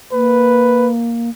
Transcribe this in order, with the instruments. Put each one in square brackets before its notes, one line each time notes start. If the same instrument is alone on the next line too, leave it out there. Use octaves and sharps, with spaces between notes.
[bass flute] A#3 [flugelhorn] B4